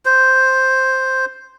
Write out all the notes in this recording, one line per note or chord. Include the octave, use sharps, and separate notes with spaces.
C5